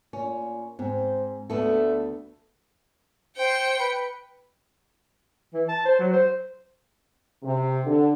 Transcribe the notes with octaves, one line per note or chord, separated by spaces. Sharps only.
A#2 C#4
G#2 C4 C5
D2 D3 A3 B3 A4
C5 G5 C#7
B4
E3
A5
C5
F#3
C5
C3
D3